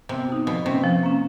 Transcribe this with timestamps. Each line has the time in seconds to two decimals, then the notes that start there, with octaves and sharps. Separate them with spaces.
0.09 C3 B3
0.28 D#4 F#4
0.47 B2 F3
0.65 C3 A#3 C#4
0.84 F3
1.03 A#3 C#4